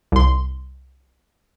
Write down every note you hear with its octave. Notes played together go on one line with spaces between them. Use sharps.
C2 C6